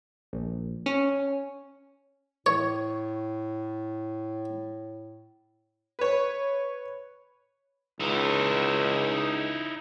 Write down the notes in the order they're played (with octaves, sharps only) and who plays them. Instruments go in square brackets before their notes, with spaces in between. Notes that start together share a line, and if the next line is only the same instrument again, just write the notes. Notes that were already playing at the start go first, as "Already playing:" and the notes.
[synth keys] A#1
C#4
[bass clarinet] A2 [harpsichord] C#5
[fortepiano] B4 C#5
[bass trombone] C#2 [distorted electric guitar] D#4 E4